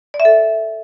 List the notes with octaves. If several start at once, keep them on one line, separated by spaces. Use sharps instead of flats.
D5
E5
A4